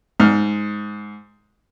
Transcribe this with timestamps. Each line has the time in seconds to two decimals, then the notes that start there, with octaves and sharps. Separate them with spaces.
0.20 G#2 F6